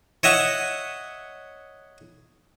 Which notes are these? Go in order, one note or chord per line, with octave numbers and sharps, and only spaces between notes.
C#5 D#5 E5 F#5